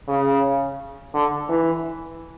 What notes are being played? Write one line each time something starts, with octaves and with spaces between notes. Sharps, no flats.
C#3
D3
E3